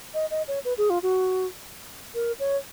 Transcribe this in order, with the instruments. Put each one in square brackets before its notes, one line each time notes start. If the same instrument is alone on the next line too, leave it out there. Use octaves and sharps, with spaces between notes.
[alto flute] D#5
D#5
C#5
B4
G#4
F4
F#4
A#4
C#5